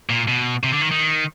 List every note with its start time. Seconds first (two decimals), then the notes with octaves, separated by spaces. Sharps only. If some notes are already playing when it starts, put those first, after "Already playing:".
0.09 A#2
0.28 B2
0.64 C3
0.73 D3
0.81 D#3
0.91 D#3